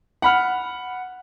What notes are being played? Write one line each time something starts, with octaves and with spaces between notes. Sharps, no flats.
F#5 B5 F6